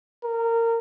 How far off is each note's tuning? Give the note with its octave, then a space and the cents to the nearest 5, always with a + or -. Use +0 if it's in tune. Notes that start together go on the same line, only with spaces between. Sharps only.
A#4 -20